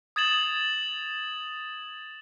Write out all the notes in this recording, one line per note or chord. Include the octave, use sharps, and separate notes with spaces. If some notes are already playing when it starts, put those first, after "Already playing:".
D#6 G#6 A6 E7 F#7